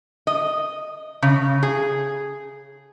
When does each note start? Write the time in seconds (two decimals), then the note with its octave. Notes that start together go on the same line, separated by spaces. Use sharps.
0.27 D#5
1.22 C#3
1.63 G#4